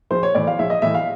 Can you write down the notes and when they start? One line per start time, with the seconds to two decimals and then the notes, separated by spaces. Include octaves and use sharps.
0.11 A#1 C5
0.23 C#5
0.35 A2 E3 D5
0.47 F5
0.59 A#1 E5
0.70 D#5
0.82 A2 E3 E5
0.94 F5